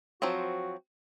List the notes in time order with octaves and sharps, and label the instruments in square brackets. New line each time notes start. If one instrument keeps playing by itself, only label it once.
[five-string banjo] F3 F#3 C4 [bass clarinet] F#4